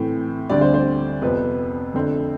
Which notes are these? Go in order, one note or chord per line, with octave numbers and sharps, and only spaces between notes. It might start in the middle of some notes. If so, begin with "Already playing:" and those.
Already playing: A2 E3 A3 C4
D2 D3 G3 C4 D5
C5
C5
F2 C3 F3 B3 B4
F2 D3 A3 C4 A4